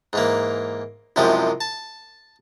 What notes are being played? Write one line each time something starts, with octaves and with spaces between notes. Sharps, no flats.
G#2 E3 A#3
C2 F#2 C3 F3 G#3 G4
A5